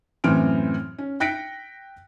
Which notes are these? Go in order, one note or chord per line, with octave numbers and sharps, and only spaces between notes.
F#2 A2 E3 C4 F6 D7
C#4
G5 F#6 A#6 B6 C#7 D7